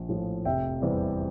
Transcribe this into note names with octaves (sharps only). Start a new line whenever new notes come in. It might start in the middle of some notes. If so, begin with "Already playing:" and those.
Already playing: A#1
A2 F3
F1 E5 G5
E2 C3 E3 G3